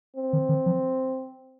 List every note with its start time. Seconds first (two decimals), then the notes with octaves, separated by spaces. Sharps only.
0.17 C4
0.33 D#3
0.49 D#3
0.66 F3